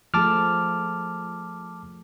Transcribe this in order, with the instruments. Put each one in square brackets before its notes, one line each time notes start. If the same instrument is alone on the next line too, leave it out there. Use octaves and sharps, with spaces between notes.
[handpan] F3 A3 G#4 [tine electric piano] A5 D6 F6